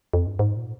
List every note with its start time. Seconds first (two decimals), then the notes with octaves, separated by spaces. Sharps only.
0.14 F2
0.27 G2
0.39 G#2
0.57 A#2